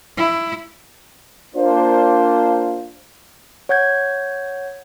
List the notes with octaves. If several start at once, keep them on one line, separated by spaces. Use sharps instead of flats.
E4
A#3 D4 F4 C5
C#5 F#5 G6 G#6